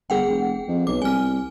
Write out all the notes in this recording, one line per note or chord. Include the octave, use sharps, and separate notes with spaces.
G1 G#4 F#5 G5
F1
F2
B1 D6
C2 G#5 F6